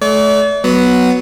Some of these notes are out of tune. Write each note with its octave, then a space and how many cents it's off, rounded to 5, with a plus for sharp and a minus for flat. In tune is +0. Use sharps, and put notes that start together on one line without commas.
A3 -35 D5 -45
F#3 +0 B3 +0 F#5 +0